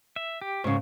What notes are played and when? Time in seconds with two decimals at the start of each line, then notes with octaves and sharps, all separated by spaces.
0.16 E5
0.42 G4
0.64 G#2 C#3 A#3 B3 C#6